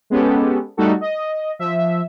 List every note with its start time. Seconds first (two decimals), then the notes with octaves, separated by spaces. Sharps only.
0.10 G#3 B3 C#4 G4 A4
0.77 G3 A3 D#4 F#4 A4
1.01 D#5
1.59 F3 E5